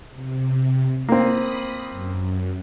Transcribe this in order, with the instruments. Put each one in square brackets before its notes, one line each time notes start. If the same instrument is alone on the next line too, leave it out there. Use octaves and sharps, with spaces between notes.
[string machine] C3
[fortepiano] A#3 C4 [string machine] B5 D#6
[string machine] F#2